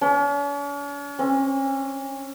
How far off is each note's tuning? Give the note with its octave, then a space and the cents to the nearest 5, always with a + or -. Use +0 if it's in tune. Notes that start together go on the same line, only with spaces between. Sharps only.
C#4 +45
C#4 -35